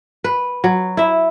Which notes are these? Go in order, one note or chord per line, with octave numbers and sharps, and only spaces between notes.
B4
F#3
E4 E5